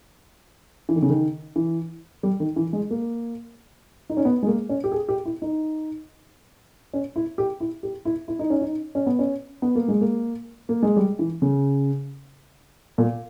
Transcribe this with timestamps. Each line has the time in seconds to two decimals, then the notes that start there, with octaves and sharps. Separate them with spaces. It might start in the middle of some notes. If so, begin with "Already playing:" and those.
0.89 E3
0.96 D#3
1.02 C#3
1.10 D#3
1.56 E3
2.23 G3
2.40 D#3
2.56 E3
2.73 G#3
2.90 A#3
4.10 D#4
4.17 C#4
4.25 B3
4.43 G#3
4.47 A#3
4.69 C#4
4.84 G4
4.92 G#4
5.09 G4
5.25 E4
5.42 D#4
6.94 C#4
7.16 E4
7.38 G4
7.60 E4
7.83 G4
8.05 E4
8.28 E4
8.39 D#4
8.50 C#4
8.62 D#4
8.95 C#4
9.06 B3
9.19 C#4
9.62 B3
9.75 A#3
9.88 G#3
10.01 A#3
10.69 A#3
10.83 G#3
10.96 G3
11.19 E3
11.42 C#3
12.98 A#2